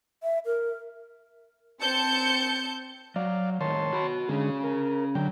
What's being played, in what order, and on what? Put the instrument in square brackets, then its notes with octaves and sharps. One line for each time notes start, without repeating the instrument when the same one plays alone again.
[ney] E5
A#4
[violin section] C4 A5 G6 C#7
[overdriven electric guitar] F#3 [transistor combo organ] D5 F5
[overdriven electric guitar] A2 D#3 [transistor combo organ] C#5 A5 C6
[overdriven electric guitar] F#4 B5
[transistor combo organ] D3 G#3 [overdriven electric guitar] C#4 G#4
[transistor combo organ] A#4
[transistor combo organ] D3 G5 [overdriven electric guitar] F#3